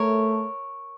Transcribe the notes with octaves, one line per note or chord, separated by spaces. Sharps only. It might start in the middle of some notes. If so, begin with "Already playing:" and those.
Already playing: A3 A#4 C#5